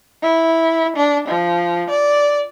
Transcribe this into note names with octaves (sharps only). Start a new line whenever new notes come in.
E4
D4
F3
D5